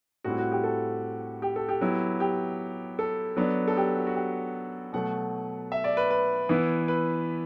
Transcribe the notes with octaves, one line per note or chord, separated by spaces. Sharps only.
A2 G3 C4 E4 F#4
F#4
G4
A4
G4
A4
G4
F#3 B3 E4
G4
A4
F#3 B3 D4
A4
G4
F#4
F#4
G4
B2 F#3 A3 F#5
E5
D5
B4
B4
E3 B3 E4
B4